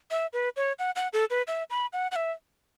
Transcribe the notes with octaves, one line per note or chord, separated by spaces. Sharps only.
E5
B4
C#5
F#5
F#5
A4
B4
E5
B5
F#5
F#5
E5